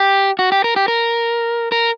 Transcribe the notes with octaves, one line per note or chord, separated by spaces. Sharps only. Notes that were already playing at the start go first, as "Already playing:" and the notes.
Already playing: G4
F#4
G4
A#4
G4
A#4
A#4